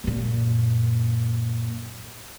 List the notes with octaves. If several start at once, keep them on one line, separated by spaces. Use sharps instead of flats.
F#2 A#2